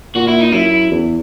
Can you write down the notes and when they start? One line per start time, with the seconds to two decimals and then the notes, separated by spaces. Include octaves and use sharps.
0.15 A#2 F#4
0.28 E4
0.40 D#4
0.52 F#2 E4
0.91 E2